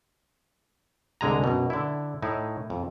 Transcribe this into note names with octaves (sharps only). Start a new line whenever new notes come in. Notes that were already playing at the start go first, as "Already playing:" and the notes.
C2 D3 G#3 G#5 A#5
F#2 B2
D3 E4
A2 D#4 E4
F2